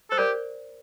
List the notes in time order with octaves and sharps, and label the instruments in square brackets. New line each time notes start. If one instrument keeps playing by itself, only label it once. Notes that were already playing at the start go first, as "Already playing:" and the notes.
[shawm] A4 [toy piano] C5
[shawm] G4 [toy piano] A#4 D5